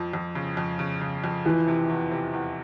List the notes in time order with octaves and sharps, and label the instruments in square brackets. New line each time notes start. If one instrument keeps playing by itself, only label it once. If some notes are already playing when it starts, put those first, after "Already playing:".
Already playing: [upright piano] F2 F3
F2
C#3
F2
C#3
C#3
F2
[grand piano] E3 [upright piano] F3
[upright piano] C3
E2
C3
E2